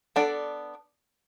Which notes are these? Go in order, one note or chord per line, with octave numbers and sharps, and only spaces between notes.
B3 D4 A4 D5